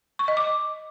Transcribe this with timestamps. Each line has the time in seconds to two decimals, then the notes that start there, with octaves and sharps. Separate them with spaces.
0.19 C#6
0.28 D#5
0.37 D6